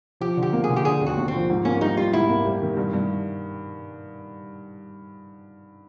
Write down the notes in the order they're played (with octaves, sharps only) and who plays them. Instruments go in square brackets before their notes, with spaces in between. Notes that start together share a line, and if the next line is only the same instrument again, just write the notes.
[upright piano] F3 [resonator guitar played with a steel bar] G4
[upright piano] D3
[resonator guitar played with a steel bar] G4
[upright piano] A#3
[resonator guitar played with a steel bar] G#4
[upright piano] D3
[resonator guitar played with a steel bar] G4
[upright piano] D3 [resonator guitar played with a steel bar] G#4
[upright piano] D#2
[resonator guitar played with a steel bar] F#4
[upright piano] D#2
[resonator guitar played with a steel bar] C4
[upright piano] F3
G#2
[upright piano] A#3 [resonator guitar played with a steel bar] C#4
[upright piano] G3 [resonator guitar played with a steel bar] D#4
[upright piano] G3 [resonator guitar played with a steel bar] F4
[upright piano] G#2 [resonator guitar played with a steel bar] E4
[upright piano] A#3
G3
D#3
G2
G2